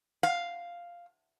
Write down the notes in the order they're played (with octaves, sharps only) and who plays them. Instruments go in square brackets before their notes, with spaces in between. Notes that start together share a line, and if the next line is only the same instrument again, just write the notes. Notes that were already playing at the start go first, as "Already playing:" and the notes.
[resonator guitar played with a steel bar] F5